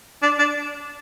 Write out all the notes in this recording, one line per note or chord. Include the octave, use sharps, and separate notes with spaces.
D4
D4